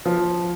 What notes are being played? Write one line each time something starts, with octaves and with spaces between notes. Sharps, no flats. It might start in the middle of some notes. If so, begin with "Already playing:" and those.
F3